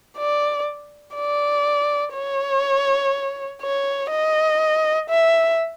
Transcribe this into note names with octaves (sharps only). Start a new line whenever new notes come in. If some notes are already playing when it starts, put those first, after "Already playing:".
D5
D5
C#5
C#5
D#5
E5